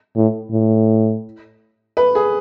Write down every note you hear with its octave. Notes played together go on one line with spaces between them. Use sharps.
A2
A2
B4
G#4